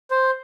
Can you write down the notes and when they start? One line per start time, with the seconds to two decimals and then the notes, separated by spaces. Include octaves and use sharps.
0.11 C5